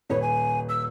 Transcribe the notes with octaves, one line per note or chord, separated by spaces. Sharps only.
D#1 B4 C#5
G#5
E6